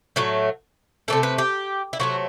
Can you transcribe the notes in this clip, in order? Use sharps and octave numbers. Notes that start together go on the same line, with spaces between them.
A2 F#3 A3
C3 E3 A3 A4
B4
G4
E4
C3 F#3 A3 F#4